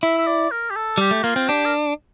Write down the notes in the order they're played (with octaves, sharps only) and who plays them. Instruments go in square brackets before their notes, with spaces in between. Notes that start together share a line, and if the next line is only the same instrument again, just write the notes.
[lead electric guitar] E4 [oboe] E5
[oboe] E5
D5
A#4
G4
A4
[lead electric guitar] G3 [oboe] G4
[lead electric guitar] A3
[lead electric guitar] A#3 [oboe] F4
[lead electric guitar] C4
[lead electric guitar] D4 [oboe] G4
[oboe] A#4